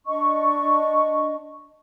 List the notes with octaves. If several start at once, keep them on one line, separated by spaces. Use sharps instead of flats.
D4 D#5 C#6